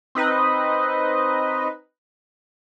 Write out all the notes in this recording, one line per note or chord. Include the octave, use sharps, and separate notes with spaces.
C4 D#4 B4 D#5